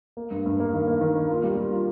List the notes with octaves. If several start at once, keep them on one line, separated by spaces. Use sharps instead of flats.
A#3
G2
G2
A#3
D#3
A#3
D#3
A#3
F4
G3
G3
F4